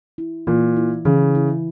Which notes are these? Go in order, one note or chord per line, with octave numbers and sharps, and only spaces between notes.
E4
A#2 E3
E4
C#3 E3
E4